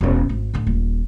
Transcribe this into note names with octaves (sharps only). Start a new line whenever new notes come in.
E1 C#4
G#1
A2 D3
D#1